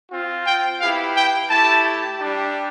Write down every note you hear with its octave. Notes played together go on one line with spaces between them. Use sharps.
C4 F4
G5
B3 E4 G4 F5
G5
A3 E4 G4 A5
G3 D4 G4